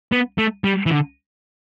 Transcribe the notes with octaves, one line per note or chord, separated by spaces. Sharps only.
B3
A3
G3
E3
D3